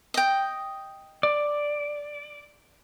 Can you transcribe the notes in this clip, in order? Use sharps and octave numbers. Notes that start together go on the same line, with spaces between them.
D#5 G5
D5